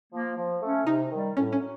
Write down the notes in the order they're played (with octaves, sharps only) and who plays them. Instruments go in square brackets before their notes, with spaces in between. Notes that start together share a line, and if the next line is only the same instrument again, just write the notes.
[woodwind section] F3 A#3
F3
A3 C#4
[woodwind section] C3 [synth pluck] D#4
[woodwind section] D#3 G3
[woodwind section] A2 [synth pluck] C#4
[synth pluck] C#4
[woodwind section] F#3